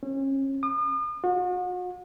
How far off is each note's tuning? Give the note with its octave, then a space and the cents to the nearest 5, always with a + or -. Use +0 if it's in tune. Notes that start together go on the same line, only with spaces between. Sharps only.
C#4 -35
D#6 -40
F#4 -40